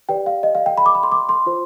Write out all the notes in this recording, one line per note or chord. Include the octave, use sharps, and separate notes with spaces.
G4 B4 D5 G5
F5
D#5
F5
G5
B5
D6
B5
C6
D6
C6
F4 C5